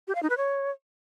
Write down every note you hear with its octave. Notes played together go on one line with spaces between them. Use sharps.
G4
F5
D#4
B4
C#5